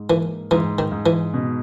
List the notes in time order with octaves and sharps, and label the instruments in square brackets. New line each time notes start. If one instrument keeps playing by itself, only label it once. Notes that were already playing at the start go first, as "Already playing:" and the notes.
Already playing: [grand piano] G#2
[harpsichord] E3 [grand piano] A#3
[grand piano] G#2 [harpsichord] E3
[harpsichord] D#3
[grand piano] G#2
[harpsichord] E3
[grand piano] B2